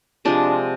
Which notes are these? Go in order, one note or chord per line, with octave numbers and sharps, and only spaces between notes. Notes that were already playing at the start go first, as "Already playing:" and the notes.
C3 F3 G#3 D4